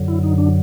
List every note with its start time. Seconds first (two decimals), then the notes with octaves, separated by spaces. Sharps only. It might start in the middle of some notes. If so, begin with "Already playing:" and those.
Already playing: F#2 D3 F#3
0.08 E4
0.23 D#4
0.38 D4